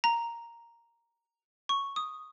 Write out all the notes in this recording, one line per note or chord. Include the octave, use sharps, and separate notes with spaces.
A#5
C#6
D#6